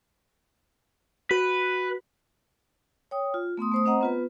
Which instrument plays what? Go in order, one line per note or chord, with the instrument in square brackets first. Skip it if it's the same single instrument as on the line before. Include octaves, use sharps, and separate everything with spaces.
[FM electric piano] F#4 [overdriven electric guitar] B4
[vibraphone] C#5 G5 D#6
F4
A3 B3 C6 D#6
A3 C5 D#6
C4 C5 D#5 F#5 A#5
B3 F4 B4